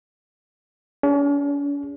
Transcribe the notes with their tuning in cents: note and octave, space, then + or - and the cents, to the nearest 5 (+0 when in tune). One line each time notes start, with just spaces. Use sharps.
C#4 +45 G#4 -35